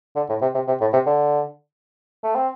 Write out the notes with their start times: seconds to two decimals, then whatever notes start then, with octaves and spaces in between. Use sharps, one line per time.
0.16 D3
0.29 A2
0.42 C3
0.54 C3
0.68 C3
0.81 A2
0.93 C3
1.06 D3
2.23 A3
2.35 C4